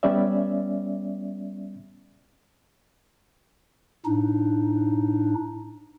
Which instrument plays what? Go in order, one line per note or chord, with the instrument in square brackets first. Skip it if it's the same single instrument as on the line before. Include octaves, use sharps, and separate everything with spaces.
[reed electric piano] G3 B3 C#4 D5 E5
[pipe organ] A2 D4 D#4